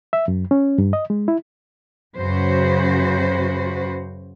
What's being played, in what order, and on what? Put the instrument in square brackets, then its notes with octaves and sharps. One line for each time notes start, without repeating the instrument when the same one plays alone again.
[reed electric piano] E5
F#2
C#4
G2
D#5
G#3
E4
[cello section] F#2 C#3 F#4 B4 C5